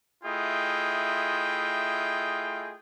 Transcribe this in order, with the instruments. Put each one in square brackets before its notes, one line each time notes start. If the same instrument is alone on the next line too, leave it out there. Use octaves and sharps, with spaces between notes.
[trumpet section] A3 E4 F4 G#4 D#5 G5